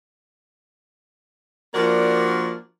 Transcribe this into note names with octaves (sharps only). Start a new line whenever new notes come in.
F3 A#3 D4 F#4 A#4 D5